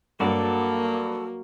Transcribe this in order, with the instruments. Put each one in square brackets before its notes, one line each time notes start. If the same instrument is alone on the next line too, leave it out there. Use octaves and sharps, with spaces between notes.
[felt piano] G2 [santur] F#3 C#6 [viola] A#3 [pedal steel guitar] F#4 A4 D5